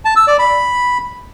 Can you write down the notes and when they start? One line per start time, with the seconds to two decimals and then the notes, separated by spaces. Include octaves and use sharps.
0.05 A5
0.16 E6
0.28 D5
0.39 B5